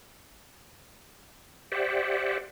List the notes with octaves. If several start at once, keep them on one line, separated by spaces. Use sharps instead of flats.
G4 C5 D5 E5 F#5